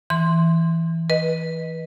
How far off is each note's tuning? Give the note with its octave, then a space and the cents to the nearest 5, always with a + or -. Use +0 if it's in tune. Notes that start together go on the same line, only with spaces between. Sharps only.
E3 +0 C6 +0
B4 -20 D#5 +0